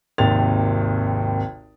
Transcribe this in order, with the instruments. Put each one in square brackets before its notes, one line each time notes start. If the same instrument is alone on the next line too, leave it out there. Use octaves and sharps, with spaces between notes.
[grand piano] G#1 D#2 C3 A6 F7